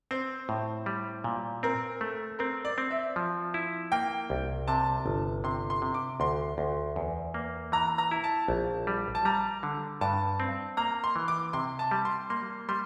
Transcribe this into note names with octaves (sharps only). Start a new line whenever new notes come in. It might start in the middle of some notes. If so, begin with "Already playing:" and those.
C4 C5
A2
G3
A#2
C4 A#4
A3
C4 A#4
D5
C4
E5
F3
E4
A#3 G5
C2
C3 A5
G1
C3 C6
C6
C3
D6
D2 C6
D2
E2
A#3
E3 A#5
A#5
E4
A5
A#1
G3
A5
G3 A#5
D3
G2 A5
C4
A#3 A#5
C6
E3
D6
C3 C6
A5
G3
C6
A#3 C6
G3 C6